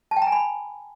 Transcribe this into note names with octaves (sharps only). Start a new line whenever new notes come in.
A5
G5
A#5
G#5
B5